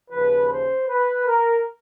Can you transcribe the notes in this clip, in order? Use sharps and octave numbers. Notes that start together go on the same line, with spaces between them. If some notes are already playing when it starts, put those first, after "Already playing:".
D#2 C#3 F3 B4
C5
B4
A#4